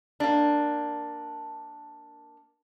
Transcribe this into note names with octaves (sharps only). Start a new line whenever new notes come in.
A#3 D4